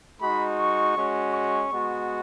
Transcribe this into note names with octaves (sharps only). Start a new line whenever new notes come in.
G#3 D#4 F#4 B5
C#6
G#3 C#4 F#4
C#6
G#3 B3 F#4